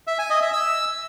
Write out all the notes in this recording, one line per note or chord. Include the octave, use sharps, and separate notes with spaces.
E5
G#5
D#5
E5
E6